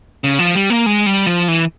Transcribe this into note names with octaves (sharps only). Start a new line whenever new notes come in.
C#3
F3
G3
A#3
G#3
G3
F3
E3